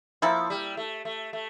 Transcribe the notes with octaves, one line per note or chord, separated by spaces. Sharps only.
F3 A#3 E4 A4
G3
A3
A3
A3